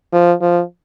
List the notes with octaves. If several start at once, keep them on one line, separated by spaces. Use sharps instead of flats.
F3
F3